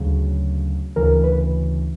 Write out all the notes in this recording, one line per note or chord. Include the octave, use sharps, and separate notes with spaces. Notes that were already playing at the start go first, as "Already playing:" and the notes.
Already playing: D2 C#3 F#3
D2 C#3 E3 A#4
B4